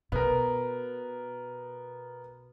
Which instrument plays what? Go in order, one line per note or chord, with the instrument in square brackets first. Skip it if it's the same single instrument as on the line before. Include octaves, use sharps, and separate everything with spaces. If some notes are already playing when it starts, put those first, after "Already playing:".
[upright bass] B2 [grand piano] B3 A#4